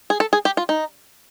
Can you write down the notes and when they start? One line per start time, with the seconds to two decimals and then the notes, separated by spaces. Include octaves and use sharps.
0.10 G#4
0.20 A4
0.33 G#4
0.45 G4
0.57 F4
0.69 D#4